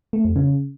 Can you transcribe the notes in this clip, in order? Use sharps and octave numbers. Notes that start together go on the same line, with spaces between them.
A3
F2
C#3